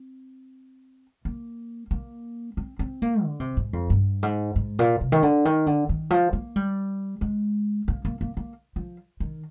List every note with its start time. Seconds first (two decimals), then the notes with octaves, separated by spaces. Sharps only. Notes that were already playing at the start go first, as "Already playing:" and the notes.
Already playing: C4
1.25 A#3
1.91 A#3
2.57 C4
2.79 C4
3.02 A#3
3.24 D3
3.40 C3
3.57 G#2
3.73 F2
3.90 G2
4.23 G#2
4.56 G#2
4.79 A#2
5.01 C3
5.12 D#3
5.23 D3
5.45 D#3
5.66 D3
5.89 D#3
6.10 F3
6.33 A#3
6.56 G3
7.21 G#3
7.88 A#3
8.05 A#3
8.21 A#3
8.37 A#3
8.76 F3
9.20 D#3